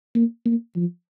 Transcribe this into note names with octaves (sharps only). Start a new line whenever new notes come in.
A#3
A#3
F3